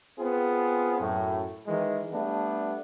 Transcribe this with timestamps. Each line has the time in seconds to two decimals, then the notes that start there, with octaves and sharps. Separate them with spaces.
0.17 B3 C4 F4 G#4
1.00 F#2 A2
1.67 D#3 E3 G#3
2.11 G3 A3 B3 D4